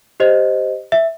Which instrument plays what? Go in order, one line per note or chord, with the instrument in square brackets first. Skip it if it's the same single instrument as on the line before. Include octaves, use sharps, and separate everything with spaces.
[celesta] G4 C5 D#5
E5